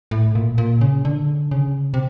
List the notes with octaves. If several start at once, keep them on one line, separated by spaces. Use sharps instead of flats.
A2
A#2
A#2
C#3
D3
C#3
C3